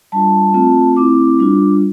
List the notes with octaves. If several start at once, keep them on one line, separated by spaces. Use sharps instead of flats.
G3 D4 F4 A5
A3 C4 F4
A3 C4 E4 D6
G3 D4 F4